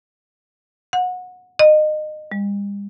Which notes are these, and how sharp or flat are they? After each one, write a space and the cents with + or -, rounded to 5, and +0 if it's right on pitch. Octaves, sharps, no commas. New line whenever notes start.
F#5 -25
D#5 -25
G3 +45